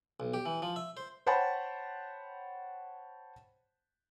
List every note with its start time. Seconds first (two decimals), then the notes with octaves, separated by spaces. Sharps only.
0.20 B1
0.34 G4
0.46 E3
0.62 F3
0.76 E5
0.97 C5
1.27 C5 C#5 F#5 G5 A5 B5